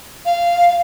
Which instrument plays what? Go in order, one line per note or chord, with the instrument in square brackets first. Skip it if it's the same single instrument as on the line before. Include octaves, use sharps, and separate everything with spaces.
[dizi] F5